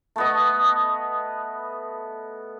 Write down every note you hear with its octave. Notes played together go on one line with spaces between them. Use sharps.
A3 B3 D#5